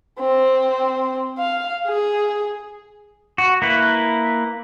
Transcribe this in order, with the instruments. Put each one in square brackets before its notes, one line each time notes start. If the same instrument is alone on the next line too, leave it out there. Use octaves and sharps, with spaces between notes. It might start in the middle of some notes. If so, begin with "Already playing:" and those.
[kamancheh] C4
F5
G#4
[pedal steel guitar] F#4
A#3 E4 B4